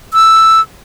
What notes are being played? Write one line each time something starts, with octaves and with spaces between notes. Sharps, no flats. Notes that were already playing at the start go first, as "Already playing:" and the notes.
E6